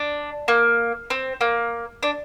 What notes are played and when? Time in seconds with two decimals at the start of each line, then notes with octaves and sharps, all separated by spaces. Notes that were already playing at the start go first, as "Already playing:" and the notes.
Already playing: D4
0.48 A#3
1.10 C4
1.41 A#3
2.03 D4